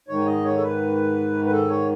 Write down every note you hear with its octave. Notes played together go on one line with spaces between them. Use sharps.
G#2 D#3 C#5
D#5
C#5
A4
B4
B4
A4
C#5